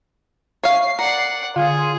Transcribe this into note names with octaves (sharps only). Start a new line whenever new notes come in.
C#5 E5 F5 C7
A#4 D5 F#5
D3 F4 G#4